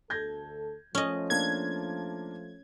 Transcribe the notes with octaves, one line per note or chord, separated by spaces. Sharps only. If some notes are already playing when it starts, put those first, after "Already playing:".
D2 A4 G6 G#6 A#6
F3 A3 C#4 D#5
A#3 D4 A5 G#6